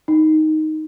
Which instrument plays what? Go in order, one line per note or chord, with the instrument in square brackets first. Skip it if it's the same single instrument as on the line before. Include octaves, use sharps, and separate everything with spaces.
[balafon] D#4